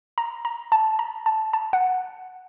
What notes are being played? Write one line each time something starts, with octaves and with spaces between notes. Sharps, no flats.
A#5
A#5
A5
A#5
A5
A5
F#5